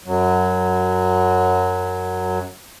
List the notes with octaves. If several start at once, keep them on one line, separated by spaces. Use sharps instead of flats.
F#2 F#3